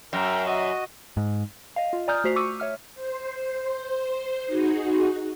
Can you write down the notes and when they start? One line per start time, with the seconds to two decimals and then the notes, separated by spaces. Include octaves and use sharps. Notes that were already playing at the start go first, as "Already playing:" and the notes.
0.13 F#2 A#4 G5 A#5
0.46 F#4 D#5
1.17 G#2
1.76 D#5 F5
1.93 F4
2.08 D5 G#5 A#5 D#6 F6 G6
2.24 A3 F#4 C5 B6 C7 F7
2.36 C#6 D6 E6 C#7 D#7
2.60 C#5 E5 F6
2.95 C5
4.46 D#4 F#4 G#4